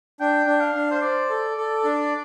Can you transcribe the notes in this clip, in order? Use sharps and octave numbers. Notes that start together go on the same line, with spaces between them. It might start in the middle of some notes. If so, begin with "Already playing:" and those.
D4 G5
D4
F5
D4
C5
C5 D5
A4
A4
D4